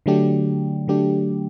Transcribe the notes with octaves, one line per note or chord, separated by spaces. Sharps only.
D3 F#3 A3 D4 G4
D3 F#3 A3 D4 G4